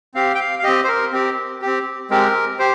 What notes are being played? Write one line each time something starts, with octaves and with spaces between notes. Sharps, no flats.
C4 G4 F5
G5
F5
F5
C4 G4 D#5
C5
A#4
C4 G4
C4 G4
G#3 C4 G4 A#4
G4 C5